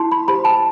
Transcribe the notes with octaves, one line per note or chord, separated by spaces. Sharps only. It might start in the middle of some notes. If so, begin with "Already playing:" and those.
Already playing: E4 A5 C6
B5
G4 C5 B5
A5